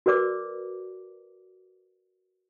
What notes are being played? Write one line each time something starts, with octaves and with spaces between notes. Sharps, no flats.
F#4 A#4 B4 D5 D6